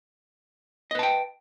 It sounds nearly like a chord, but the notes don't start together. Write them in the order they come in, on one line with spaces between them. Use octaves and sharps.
D#5 B4 A5 G5